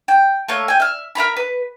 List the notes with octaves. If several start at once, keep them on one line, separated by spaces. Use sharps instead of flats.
G5
A3 A#3 C#5
G5 G#5
E5 F6
A#4 E5 A#5 B5
B4